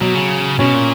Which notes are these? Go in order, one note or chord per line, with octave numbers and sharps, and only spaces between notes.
B2 F#3
C#3
B2 C#4
A#2